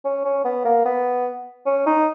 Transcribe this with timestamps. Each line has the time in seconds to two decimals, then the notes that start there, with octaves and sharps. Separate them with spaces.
0.04 C#4
0.25 C#4
0.45 B3
0.65 A#3
0.85 B3
1.66 C#4
1.86 D#4